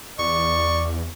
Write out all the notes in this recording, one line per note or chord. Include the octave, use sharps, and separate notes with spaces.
E2 D5 C#6